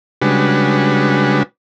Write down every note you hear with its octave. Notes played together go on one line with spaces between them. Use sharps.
C#3 G3 G#3 D4 F#4 B4